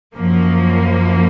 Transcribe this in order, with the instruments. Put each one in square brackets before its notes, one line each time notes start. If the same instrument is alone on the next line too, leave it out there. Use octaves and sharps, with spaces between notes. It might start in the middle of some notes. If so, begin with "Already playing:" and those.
[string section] F#2 F3 A#3